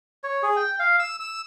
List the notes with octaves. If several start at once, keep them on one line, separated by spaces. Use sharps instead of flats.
C#5
G#4
G5
F5
E6
E6